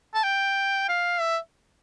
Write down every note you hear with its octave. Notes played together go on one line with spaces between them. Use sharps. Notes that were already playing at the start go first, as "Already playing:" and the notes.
A5
G5
F5
E5